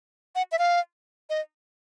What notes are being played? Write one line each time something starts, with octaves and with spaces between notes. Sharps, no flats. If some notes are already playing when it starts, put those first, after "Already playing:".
F#5
E5
F5
D#5